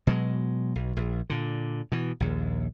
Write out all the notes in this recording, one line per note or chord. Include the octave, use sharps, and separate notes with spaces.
B2 F#3 G#3
B1
A#1
A#2 D3
B2 E3
A#1 D#2